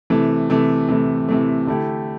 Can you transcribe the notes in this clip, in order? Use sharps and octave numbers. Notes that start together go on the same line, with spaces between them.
C3 E3 A3
C3 E3 A3
C3 E3 A3
C3 E3 A3
D3 A3 E4 G4